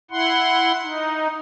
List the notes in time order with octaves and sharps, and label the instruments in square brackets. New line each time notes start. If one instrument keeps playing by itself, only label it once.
[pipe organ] E4 F#5 C6
D#4